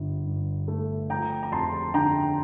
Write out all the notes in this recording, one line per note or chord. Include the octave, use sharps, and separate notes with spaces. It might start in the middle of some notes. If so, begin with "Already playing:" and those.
Already playing: G1 D3
G2
A3
F3 G5 A#5
A#5
F2 A5 C6
D3 G5 A#5